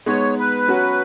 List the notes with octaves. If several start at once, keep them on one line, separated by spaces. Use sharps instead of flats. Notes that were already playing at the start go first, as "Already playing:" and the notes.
G#3 B3 D#4 C#5
B4
F#3 C#4 F#4